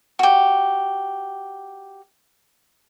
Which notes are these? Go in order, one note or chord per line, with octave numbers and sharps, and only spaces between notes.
F#4 G4